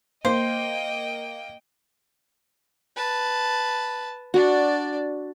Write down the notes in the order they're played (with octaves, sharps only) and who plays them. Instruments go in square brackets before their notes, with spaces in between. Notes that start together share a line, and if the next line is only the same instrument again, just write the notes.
[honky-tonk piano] A#3 [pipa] C5 [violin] D#5 G5
[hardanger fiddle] B4 A5
[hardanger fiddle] D4 D5 [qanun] F#4